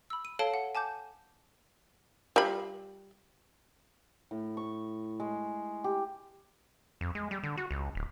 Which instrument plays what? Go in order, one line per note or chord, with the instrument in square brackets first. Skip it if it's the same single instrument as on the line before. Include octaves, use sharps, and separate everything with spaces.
[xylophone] B5 E6
D#7
A4 C#5 F5 A5 D7 G7
F#5
G#5 A5 D6 G6
[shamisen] G3 F4 B5
[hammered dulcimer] A2
C#6
G#3
G4
[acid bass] F2
G#3
G3
D3
F#4
C#2
D1